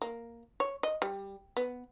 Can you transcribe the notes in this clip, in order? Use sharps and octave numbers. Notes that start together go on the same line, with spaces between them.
A#3
C#5
D#5
G3
B3